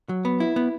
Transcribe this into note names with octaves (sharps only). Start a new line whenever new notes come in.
F#3
B3
E4
B3